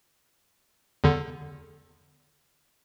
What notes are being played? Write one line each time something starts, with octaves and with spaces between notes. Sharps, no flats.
E2 D3